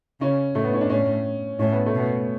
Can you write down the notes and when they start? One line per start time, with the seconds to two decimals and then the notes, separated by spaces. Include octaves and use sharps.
0.20 C#3 C#4
0.55 A2 A3
0.64 B3
0.74 C#4
0.81 D4
0.90 A2 C#4
1.59 A2 C#4
1.72 B3
1.86 A3
1.94 B2 B3